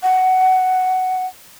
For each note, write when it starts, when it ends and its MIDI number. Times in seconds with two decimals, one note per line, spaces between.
0.03 1.26 78